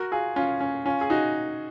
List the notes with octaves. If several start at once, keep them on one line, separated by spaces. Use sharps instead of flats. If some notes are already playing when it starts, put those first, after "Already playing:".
Already playing: F#4 A#4
F4 G#4
C#4 F4
C#4
C#4 F4
G#4
D#4 F#4